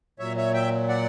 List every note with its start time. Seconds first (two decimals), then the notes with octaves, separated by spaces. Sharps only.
0.19 A#2 F#3 C#5 E5
0.37 C#5 E5
0.54 E5 G5
0.89 D5 F#5